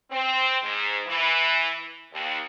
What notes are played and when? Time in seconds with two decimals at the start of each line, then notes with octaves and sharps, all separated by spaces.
0.11 C4
0.62 G#2
1.08 E3
2.13 D#2